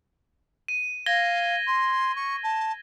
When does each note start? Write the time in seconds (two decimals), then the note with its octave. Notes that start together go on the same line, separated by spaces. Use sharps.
0.68 D#7
1.06 F5 G#6 A#6 G7
1.67 C6
2.15 C#6
2.43 A5